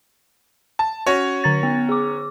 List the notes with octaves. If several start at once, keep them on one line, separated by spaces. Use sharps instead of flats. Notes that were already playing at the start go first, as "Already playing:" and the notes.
A5
C#4 F#4 C#5
D3 A#5 A6
B3
G#4 D6